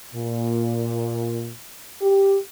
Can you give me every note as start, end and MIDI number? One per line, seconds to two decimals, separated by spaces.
0.14 1.51 46
2.02 2.38 67